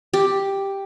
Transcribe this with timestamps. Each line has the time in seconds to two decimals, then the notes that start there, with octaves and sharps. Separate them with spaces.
0.14 G4